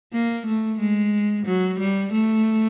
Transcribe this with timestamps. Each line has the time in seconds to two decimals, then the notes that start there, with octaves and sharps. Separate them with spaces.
0.13 A#3
0.46 A3
0.79 G#3
1.46 F#3
1.79 G3
2.13 A3